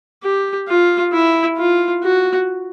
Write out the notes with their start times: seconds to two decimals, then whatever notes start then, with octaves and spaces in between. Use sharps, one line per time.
0.23 G4
0.68 F4
1.12 E4
1.58 F4
2.03 F#4